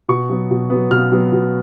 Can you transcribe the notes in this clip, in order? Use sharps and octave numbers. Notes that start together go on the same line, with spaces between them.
B2 C#6
F#3 B3
B2
F#3 B3
B2 F6
F#3 B3
B2